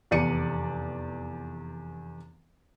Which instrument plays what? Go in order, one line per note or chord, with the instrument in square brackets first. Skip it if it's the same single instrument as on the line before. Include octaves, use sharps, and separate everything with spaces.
[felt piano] F1 E2 D5 C#7 D#7